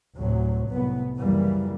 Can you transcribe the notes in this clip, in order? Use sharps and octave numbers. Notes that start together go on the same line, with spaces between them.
D2 A2 C3 F#3
C2 A2 B3
C#2 F#2 E3 G3 A#3